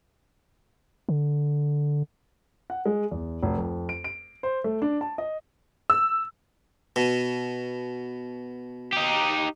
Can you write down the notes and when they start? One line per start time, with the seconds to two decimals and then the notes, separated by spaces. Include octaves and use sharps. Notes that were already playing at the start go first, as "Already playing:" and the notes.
1.09 D3
2.70 F#5
2.85 G#3
3.11 E2
3.43 F1
3.58 F2
3.89 D7
4.04 D7
4.43 C5
4.64 A3
4.82 D4
5.01 A5
5.18 D#5
5.90 E6
6.96 B2
8.93 D#4 G4